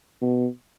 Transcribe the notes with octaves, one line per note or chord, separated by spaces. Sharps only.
B2